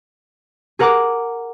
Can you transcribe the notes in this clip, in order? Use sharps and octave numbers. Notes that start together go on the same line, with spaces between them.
G#4 A#4 F#5 A#5 D6 F#6